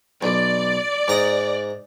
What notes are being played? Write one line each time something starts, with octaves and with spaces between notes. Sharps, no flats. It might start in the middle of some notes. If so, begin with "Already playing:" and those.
B1 D5
G#2 A#5 D#6